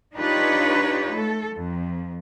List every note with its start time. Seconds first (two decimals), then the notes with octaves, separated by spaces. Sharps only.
0.14 D4 D#4 F4 G4 B4 C#5
1.13 A3 A4
1.54 F2